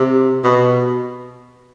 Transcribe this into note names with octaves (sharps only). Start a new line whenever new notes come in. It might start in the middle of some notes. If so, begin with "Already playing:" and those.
Already playing: C3
B2